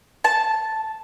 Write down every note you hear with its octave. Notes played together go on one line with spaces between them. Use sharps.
A5